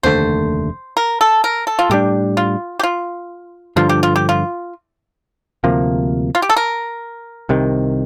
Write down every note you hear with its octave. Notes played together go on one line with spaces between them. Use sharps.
F1 D#2 D3 A3 C5
A#4
A4
A#4
A4
F4
A2 G3 D4 G4
F4
G4
F4
G2 D3 F3 F4
G4
F4
G4
F4
D2 C3 F3 A#3
F4
G4
A4
A#4
C2 C3 D#3